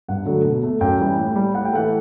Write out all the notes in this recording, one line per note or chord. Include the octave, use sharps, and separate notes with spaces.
G2 F#5
D3 F#3 A3
B2
A3
F#2 G5
E3 G3
A2
G3
A2 F#5
G5
E3 A3 F#5